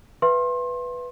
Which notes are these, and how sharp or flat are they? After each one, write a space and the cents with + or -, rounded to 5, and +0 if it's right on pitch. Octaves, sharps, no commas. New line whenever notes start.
B4 +0 E5 +40 C6 +30